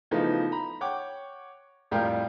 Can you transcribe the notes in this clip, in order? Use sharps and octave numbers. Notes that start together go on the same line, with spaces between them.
C#3 E3 F3 A3 B3 D#4
A#5 B5
C#5 F#5 G5 D6
F2 A2 G3 F4 A#4 G5